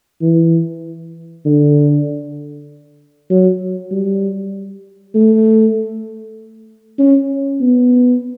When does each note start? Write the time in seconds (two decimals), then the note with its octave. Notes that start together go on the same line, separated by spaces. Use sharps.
0.22 E3
1.45 D3
3.30 F#3
3.92 G3
5.14 A3
6.99 C#4
7.61 B3